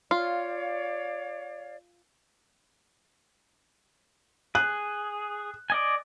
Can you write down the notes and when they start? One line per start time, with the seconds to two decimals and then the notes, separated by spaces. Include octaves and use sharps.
0.11 F4 C#5 D5 F5
4.55 G#4 F#6
5.70 D5 D#5 G#5